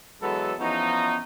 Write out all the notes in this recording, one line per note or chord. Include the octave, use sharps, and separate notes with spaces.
E3 F#3 G#3 B3 A4
E3 F3 B3 C#4 D#4